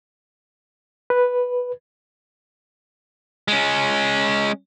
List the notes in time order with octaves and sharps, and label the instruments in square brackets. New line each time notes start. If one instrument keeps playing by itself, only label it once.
[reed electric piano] B4
[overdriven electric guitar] G#3 C#4